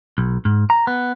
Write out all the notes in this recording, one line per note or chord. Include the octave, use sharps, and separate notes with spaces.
B1
G#2
A#5
B3